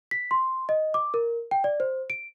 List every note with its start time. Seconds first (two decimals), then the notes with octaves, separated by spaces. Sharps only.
0.11 B6
0.31 C6
0.69 D#5
0.94 D6
1.14 A#4
1.51 G5
1.64 D5
1.80 C5
2.10 D7